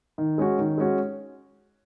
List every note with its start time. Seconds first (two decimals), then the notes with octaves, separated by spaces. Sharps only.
0.18 D#3
0.38 G#3 C#4 F#4
0.59 D#3
0.78 G#3 C#4 F#4